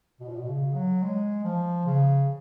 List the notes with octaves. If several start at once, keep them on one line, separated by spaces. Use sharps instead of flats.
B2
A#2
B2
C#3
F#3
G#3
F3
C#3